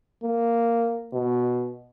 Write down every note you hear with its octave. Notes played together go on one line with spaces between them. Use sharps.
A#3
B2